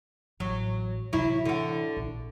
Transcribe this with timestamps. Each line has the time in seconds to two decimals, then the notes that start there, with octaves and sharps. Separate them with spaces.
0.40 A1 F#3
1.13 C3 E3 F#3 E4
1.45 D3 F#4
1.97 A#1